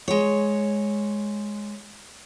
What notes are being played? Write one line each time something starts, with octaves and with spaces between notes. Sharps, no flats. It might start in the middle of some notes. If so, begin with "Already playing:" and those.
G#3 C#5